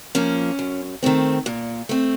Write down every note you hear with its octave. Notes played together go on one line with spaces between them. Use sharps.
F3 A#3 C#4
F#2
D#3 A3 C4
A#2
A3 C4